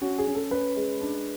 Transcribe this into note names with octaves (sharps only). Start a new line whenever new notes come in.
C#4 F#4
G#4
C#4
A4
C#4 B4
G#3
D4